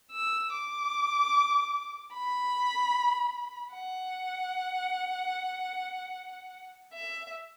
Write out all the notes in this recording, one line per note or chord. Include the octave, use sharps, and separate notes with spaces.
E6
D6
B5
F#5
E5